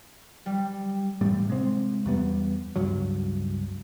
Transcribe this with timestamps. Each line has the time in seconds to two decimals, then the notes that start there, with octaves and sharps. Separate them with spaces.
0.46 G3
1.21 A1 A2 G3
1.47 C3 G#3 C4
2.06 E2 G3 B3
2.76 C#2 G2 F#3